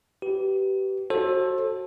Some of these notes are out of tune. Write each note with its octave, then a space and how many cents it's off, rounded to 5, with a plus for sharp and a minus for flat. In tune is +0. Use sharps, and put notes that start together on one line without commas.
G4 -25 B4 +0
F#4 +0 A4 +0 C5 +35